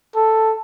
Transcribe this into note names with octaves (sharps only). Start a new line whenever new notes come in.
A4